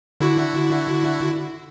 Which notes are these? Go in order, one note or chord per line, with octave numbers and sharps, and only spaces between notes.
D3 E4 F#4